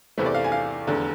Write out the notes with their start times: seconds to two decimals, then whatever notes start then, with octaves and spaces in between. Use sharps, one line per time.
0.18 E2 C3 E3 A3
0.26 D5
0.35 F5
0.44 G#5
0.52 F5
0.87 F1 E2 D3